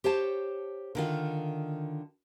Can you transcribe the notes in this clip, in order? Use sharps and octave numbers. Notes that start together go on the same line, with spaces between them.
G4 C5 C#5 A5
D3 D#3 F4